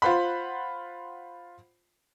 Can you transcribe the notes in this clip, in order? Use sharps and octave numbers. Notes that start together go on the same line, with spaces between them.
F4 C5 F#5 B5